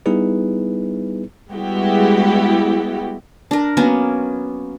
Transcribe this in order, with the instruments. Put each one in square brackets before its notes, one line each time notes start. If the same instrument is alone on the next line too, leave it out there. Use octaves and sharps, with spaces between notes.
[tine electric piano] G3 B3 D#4 E4 G#4 B4
[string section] G3 G#3 B3 E4 F#4 G4
[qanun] D4 A#4
F#3 A#3 B3 C#4